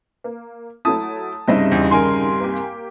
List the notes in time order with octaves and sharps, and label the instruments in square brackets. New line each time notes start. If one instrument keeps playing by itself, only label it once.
[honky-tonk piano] A#3
[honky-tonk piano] F#3 A3 E4 [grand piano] A5 D#6
[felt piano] C2 G2 D#4 [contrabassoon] C#3 [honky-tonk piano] C5 D#5 E5
[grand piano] E2
[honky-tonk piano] D#3 [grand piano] A#4 G#5 C6
[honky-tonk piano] A#3 G4